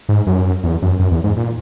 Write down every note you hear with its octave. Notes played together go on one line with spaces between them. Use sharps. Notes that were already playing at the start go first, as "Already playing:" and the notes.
G#2
F#2
E2
F#2
F#2
E2
G#2
A#2